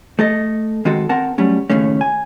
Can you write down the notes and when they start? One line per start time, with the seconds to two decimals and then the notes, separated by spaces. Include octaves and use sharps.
0.19 A3 A4 D#5
0.85 D#3 G#3 C4 F#4 A4
1.09 C4 A#4 F#5 A5
1.38 F#3 G3 A3 C#4
1.70 D#2 A2 C#3 A3 C#4
2.01 G#5